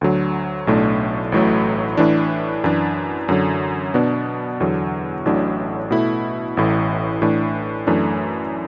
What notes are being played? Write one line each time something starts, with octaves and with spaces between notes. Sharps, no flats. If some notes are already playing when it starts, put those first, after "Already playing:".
D2 D3 F#3
B1 A2 A3 D4
A1 A2 F#3 A3
A2 E3 D4
F#2 E3 D4
F#2 D3 F#3
B2 B3 D4
E2 D3 F#3
A1 A2 F#3 D4
B2 A3 E4
A1 A2 E3
A2 E3 D4
F#2 E3 A3 D4